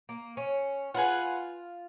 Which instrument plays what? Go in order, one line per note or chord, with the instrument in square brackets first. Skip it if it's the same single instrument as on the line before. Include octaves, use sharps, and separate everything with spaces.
[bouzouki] A#3
C#4
[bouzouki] F4 [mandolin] G#4 B4 F#5